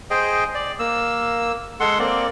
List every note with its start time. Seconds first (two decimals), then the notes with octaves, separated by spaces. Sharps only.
0.10 G#4 C5 D#5 G5
0.55 D5
0.79 A#3 E6
1.80 G#3 A4 F#5 C6
1.99 A#3 C4 D5